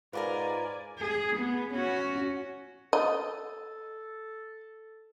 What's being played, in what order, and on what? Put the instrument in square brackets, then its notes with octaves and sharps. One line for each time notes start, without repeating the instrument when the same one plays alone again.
[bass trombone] G#2 [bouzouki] F4 F#4 A#4 [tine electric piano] B4 B5 [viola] D5 G#5
[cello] G#4
B3
C#4 F#4
[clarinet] A4 [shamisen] D#5